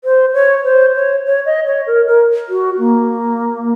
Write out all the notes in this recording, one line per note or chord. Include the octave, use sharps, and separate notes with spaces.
C5
C#5
C5
C#5
C#5
D#5
C#5
A#4
A#4
F#4
A#3